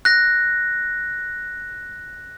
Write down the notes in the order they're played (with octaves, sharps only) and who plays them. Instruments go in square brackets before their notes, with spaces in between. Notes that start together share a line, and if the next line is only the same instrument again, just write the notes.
[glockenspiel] F#6 A#6